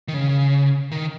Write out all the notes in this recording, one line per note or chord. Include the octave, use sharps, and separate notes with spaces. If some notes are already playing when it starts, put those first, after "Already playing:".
D#3
C#3
D#3